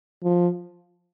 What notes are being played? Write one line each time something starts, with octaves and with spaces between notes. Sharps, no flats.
F3